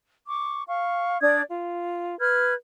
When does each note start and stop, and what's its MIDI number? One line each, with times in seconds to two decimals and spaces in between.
0.26 0.63 85
0.26 0.63 86
0.67 1.19 77
0.67 1.19 85
1.21 1.42 62
1.21 1.42 74
1.21 1.42 87
1.21 1.42 92
1.50 2.17 65
2.19 2.54 71
2.19 2.54 89
2.19 2.54 92